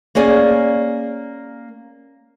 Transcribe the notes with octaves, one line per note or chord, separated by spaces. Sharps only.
A#3 C#4 G#4 D5